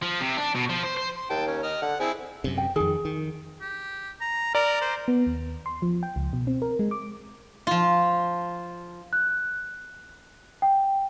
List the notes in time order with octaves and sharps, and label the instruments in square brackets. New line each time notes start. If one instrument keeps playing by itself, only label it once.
[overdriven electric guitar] F3
C3
D4
B2
F3
C5
C5
[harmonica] C6
[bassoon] D#2 [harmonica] G5 A5
[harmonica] C#4
D#5 F6
[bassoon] D3 [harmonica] F#5
[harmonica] C4 E4 [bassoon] G#4
[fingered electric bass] F#2 C3
[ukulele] G5
[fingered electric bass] F2 D#3 [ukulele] G#4
[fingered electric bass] D#3
[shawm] G4
A#5
[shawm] A#4 [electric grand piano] D5 A#5
[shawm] C5
[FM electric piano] B3
D#2
C6
F3
G5
C#2
B2
C4
A#4
G#3
D6
[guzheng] F3 F4
[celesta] F#6
G5